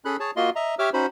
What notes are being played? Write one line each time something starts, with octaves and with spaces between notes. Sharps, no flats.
C#4 G#4 A4 B5 F#6
G#4 C#5 A5
A#3 F4 F#4 D#5 C6
D#5 E5 A#5
G4 C#5 E5 D6 E6 F6
C#4 D#4 F#4 C5 B5